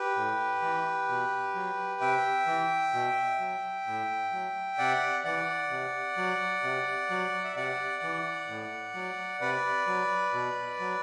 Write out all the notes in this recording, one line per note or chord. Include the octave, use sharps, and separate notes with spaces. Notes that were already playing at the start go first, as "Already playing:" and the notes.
Already playing: G4 B4
A2
E3
B2
F#3
C3 E5 G5
E3
B2
F#3
A2
F#3
C3 D5 F#5
E3 D5 F#5
C3
F#3
C3
F#3
E5
C3 D5 F#5
E3
A2
F#3
C3 B4 D5
F#3
B2
F#3